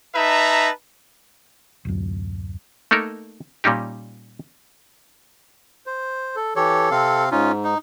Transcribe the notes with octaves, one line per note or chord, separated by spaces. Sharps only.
D#4 B4 E5 A5 A#5
D1 F#2
A3 A#3 D#4 A4 A#4
A#2 G3 C#4 D#4 G4
C5
A4
E3 G4 A4 C#5
C3 C4 F5
G#2 C#4 D#4 F4
D#4